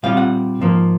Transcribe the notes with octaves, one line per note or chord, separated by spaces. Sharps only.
A#2 G3 C4 F4 F5
F#5
G#2 F3 A#3